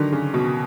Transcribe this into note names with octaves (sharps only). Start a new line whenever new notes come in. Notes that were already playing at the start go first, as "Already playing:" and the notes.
Already playing: D3 D#3 F#3
C#3
B2